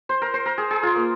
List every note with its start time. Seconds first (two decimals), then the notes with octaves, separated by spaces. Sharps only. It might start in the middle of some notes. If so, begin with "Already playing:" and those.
0.09 C5
0.22 A#4
0.34 C5
0.46 A#4
0.58 G#4
0.71 G#4
0.83 F4
0.96 A#3